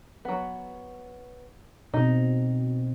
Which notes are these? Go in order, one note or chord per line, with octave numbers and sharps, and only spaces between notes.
F#3 B3
B2 C4 D#4